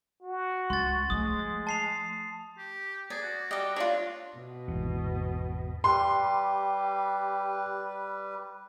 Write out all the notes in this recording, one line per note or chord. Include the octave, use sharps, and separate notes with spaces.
F#4
C#2 C6 A6
F3 G#3 A3 D#6
A5 C7 F7
G4
G#4 D5
F#4
G3 D5 D#5
D4 F4 C#5
B2
G#1 E2
G3 G4 B4 C6